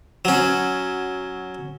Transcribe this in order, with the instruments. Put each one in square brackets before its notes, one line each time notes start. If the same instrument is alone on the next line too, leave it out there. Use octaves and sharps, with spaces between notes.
[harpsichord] F#3 C#4